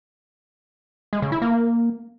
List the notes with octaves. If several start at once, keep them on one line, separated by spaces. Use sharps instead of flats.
G#3
C#3
E4
A#3